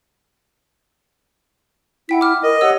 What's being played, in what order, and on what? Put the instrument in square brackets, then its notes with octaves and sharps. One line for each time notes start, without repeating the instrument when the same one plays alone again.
[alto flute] E4 [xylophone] F#5 G5 B6
[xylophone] D6 F6
[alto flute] A#4 [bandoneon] D#5
[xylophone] G4 C#5 E6 [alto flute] F#5